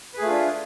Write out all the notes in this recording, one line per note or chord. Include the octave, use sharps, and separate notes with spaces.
A3 D4 F4 G#4 B4